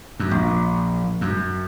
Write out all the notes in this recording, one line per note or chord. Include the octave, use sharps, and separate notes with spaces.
F#2
A#1
F#2